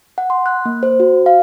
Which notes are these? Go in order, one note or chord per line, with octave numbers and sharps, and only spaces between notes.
F#5
C6
F#6
A#3
C5
F#4
F5